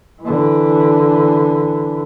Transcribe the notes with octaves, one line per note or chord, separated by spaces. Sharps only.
D3 E3